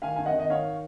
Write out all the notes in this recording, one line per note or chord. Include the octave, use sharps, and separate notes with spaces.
D#3 F5 G#5
D#3 G#5
D#5 F#5
D#3
D#5
D#3 C#5 F5